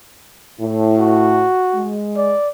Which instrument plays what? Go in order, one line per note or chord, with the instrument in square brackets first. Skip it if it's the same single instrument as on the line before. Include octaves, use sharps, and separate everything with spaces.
[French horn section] A2 E4
[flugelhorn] F#4
[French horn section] G#3
[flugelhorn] D5